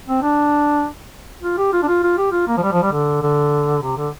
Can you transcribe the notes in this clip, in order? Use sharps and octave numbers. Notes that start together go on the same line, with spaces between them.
C4
D4
F4
G4
F4
D4
F4
F4
G4
F4
A#3
F3
G3
F3
G3
D3
D3
C3
D3